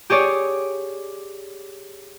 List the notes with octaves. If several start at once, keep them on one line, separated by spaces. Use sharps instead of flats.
G4 G#4 C#5 D5